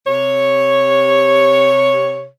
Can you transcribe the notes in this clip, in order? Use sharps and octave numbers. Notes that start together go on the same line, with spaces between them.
C3 C#5